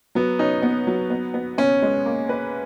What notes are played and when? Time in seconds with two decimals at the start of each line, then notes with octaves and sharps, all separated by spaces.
0.15 F#3 B3
0.39 C#4 D#4
0.62 B3
0.87 F#3
1.10 B3
1.34 B3
1.58 B3 C#4
1.82 G#3
2.06 A#3
2.29 B4